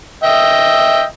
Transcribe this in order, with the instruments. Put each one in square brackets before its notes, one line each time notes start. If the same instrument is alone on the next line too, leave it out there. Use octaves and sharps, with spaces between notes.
[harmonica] D#5 E5 G5